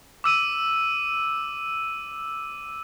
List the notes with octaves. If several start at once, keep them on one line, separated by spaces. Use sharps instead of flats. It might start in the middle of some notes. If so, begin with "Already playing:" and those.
D6 E6 D#7